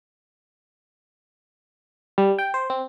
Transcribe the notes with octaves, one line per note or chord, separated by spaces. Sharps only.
G3
G5
C5
C4